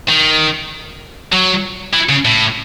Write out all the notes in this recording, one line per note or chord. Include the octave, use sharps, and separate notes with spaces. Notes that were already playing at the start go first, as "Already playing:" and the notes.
D#3
F#3
E3
C#3
A2